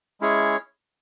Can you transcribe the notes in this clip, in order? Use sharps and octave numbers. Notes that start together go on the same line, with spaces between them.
G#3 C#4 E4 G#4 C#5